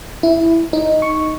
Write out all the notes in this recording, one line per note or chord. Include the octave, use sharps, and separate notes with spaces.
E4
D#4
C#6